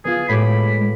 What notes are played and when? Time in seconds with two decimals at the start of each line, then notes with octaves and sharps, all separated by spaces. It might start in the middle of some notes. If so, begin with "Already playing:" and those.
0.05 B3 F4 G#4
0.29 A2 G#3 G4 B5 D6